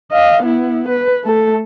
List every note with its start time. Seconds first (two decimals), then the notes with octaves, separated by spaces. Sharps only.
0.12 D#5 F5
0.43 B3 E4
0.88 B4
1.24 A3 A4